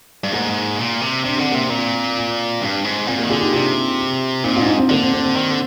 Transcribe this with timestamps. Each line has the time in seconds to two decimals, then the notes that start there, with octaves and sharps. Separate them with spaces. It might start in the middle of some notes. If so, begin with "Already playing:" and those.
0.24 G2
0.32 G#2 A#3
0.78 A#2
1.01 C3
1.24 C3 D4
1.37 D3 C4
1.51 C3 A#3
1.65 A#2 C4
2.62 G2
2.85 G#2
3.07 A#2 C4
3.18 A#3
3.24 D#3
3.30 D3 F4 G#4
3.41 D#4 G4
3.52 C3 D4 F4
4.44 A#2 C4 D#4
4.56 D4 F4
4.60 G#2
4.66 C4 D#4
4.78 C4
4.89 D3 A#3
5.02 C4
5.13 C4
5.24 C4
5.36 D#3
5.50 D3